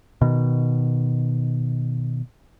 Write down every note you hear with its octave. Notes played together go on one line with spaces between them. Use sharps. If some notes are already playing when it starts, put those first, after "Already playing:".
B2 D#3